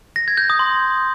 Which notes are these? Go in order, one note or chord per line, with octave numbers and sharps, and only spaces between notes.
A#6
G#6
G6
D#6
C6